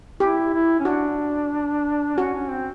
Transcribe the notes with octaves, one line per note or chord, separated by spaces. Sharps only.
E4 G4
E4
C#4
D4 F#4
C#4 F#4
C#4
C4